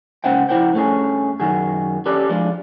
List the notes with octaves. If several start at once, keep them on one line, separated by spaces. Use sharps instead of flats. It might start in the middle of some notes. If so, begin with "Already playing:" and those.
C#2 C#4 C5 F#5 G5
F2 E4 C5 F#5 G5
G2 A3 C#4 G#4
F#2 D#3 F#4 G#4
C#4 G4 A4 B4 D5
F3 G#3 D4 F4